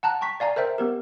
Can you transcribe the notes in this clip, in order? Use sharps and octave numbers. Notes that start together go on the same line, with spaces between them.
F#5 A5 A#5 F#6
G5 A#5 C#6 B6
D5 F5 G#5 A#5
A#4 C5 E5 G5
B3 G4 A#4